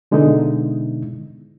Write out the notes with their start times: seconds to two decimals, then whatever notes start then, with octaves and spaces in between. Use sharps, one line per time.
0.11 B2 D3 G#3 B3 D#4 E4